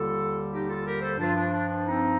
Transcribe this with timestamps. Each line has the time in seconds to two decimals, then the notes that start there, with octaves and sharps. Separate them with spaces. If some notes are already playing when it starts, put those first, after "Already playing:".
Already playing: D#2 D3 G3 F4 A4
0.51 D#4 G4
0.68 F4 A4
0.85 G4 A#4
1.01 A4 C5
1.18 G2 F3 D4 F4
1.35 D4
1.52 D4
1.69 D4
1.86 C4 D#4